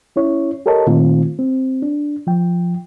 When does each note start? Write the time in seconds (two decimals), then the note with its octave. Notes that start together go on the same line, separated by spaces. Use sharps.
0.16 C#4 E4 C#5
0.66 G4 A4 A#4 C#5 D#5 A5
0.87 A#2 D#3 A3 C4 F4
1.39 C4
1.82 D4
2.27 F3 G5